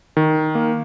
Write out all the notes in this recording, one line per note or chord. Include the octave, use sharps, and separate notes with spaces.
D#3
A#3